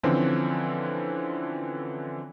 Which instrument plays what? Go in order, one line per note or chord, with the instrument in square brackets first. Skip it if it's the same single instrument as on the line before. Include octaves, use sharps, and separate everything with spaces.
[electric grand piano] D3 E3 F3 C4 C#4